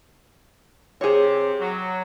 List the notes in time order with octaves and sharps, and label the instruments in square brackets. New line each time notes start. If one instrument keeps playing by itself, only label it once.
[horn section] C3 [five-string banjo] G#4 C#5
[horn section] F#3